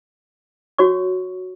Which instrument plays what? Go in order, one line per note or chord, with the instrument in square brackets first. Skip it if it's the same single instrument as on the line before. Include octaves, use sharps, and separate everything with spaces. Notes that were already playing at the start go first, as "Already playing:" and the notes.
[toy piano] F#4 C#5 C#6